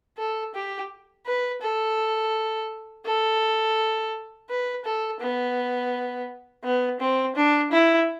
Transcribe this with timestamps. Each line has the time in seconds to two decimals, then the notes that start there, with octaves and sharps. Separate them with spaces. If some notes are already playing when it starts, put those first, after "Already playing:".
0.18 A4
0.54 G4
1.26 B4
1.62 A4
3.06 A4
4.49 B4
4.85 A4
5.20 B3
6.64 B3
7.00 C4
7.35 D4
7.72 E4